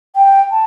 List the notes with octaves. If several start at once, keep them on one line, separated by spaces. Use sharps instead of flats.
G5
A5